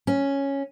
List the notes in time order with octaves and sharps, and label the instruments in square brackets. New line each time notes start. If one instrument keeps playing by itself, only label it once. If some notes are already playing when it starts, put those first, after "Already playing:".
[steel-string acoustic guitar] C#4